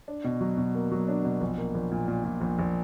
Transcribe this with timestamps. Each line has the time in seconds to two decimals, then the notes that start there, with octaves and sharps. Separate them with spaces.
0.08 D4
0.24 B2
0.41 F#3
0.57 B2
0.75 A#3
0.92 F#3
1.08 D4
1.24 B2
1.41 A#1
1.58 A#3
1.75 A#1
1.91 A#2
2.08 A#2
2.25 A#2
2.41 A#1
2.59 A#1